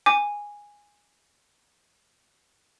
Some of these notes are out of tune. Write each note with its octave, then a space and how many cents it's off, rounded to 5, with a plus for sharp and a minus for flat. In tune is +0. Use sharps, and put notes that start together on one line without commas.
G#5 -10 D6 +5